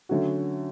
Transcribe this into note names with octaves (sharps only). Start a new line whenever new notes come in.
D3 F#3 A3 C#4 F#4